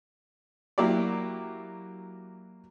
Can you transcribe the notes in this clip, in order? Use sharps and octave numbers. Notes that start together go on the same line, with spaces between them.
F#3 A#3 E4 G4 D5